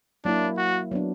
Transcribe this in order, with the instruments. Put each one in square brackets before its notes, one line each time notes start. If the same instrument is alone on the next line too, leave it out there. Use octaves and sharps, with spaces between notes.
[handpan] F#3 A#3 E4 [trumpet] D4
[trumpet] F#4
[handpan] F#3 B3 D4